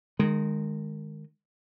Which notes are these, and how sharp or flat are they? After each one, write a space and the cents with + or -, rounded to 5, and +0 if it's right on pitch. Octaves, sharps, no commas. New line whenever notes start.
D#3 -25 G#3 +0